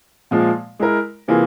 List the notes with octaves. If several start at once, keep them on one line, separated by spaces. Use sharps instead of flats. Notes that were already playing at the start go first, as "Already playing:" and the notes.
A#2 F3 G#3
G#3 E4 A#4
C3 E3 A#3 F4 G#4